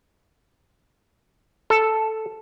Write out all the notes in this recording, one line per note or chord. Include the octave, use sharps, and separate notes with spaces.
A4